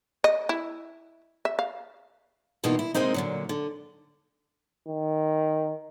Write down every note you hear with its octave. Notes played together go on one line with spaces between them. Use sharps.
D#5
E4
E5
F5
G2 B2 E3 A#3 D#4 F4
E4
C3 G#3 A#3 C4 D#4
A#2 D3 F#3
D3
D#3